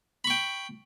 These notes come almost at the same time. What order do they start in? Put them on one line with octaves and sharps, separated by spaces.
B5 C#6 G5